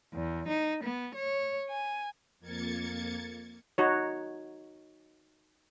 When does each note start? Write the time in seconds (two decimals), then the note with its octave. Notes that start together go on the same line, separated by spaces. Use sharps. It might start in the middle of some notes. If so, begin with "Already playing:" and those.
0.13 E2
0.48 D#4
0.82 B3
1.14 C#5
1.68 G#5
2.40 F2 A#3 G#6 A6 C#7
3.78 D#4 F#4 C#5